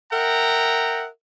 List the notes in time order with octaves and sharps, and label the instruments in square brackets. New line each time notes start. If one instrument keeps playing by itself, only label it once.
[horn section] A#4 E5 F#5 G5 A#5